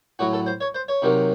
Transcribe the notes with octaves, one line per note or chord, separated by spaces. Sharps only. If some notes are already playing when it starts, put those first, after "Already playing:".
A2 F#3 F#4
A4
C5
C#5
C5
C#5
C3 D#3 F#3